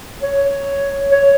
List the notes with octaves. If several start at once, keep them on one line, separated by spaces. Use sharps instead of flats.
C#5
C#5